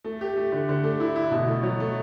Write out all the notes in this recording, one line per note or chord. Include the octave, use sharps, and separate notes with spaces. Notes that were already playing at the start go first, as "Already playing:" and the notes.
A3
G4
A3
D3
D3
A3
E4
E4
B2
A3
F#3
A3